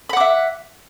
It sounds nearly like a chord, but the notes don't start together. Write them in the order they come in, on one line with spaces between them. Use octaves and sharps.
B5 F#5 D6 E5